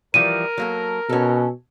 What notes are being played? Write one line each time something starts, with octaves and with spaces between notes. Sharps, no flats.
E3 F3 G3 A#4 D#7
F#3 A#3 A4
B2 C#4 A4